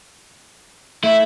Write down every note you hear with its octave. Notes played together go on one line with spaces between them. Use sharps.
A3 E4